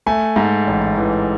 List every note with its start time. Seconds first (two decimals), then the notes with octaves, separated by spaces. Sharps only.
0.06 A3 G#5
0.36 G#2
0.67 A1
0.97 E3